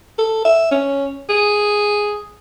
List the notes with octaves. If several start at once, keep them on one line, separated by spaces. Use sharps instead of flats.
A4
E5
C#4
G#4